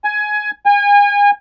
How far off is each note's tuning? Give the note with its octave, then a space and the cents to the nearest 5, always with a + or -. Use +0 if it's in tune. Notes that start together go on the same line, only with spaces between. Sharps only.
G#5 +15
G#5 -35